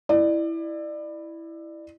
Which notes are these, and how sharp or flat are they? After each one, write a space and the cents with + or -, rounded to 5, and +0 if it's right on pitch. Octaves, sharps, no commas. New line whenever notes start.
E4 +0 D5 +25